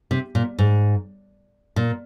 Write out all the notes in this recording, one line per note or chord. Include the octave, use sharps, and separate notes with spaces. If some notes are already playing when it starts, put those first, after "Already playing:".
C3
A#2
G#2
A#2